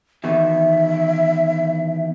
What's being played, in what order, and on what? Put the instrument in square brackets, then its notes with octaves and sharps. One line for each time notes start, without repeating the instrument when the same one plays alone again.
[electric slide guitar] E2 B2 D#3 [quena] E5